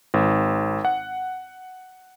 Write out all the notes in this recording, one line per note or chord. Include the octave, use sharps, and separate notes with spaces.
G#1
F#5